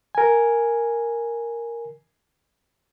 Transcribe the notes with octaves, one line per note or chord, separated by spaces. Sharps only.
A#4 G#5